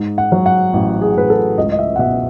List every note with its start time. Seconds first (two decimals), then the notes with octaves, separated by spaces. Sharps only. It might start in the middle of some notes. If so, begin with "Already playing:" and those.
Already playing: G#2
0.18 F#5
0.32 F#3
0.46 F#5
0.73 A1
1.01 G#4
1.15 A1 B4
1.30 A4
1.58 C#2 D#5
1.72 D#5
1.79 E5
1.96 F#5
1.99 B2 E5